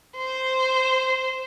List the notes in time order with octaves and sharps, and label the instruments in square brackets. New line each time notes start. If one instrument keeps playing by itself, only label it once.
[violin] C5